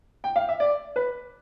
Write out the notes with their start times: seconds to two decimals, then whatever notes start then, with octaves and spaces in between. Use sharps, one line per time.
0.24 G5
0.36 F5
0.49 E5
0.60 D5
0.96 B4